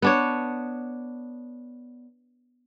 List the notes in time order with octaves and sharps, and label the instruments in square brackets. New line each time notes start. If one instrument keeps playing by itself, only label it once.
[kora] B3 D4 C#5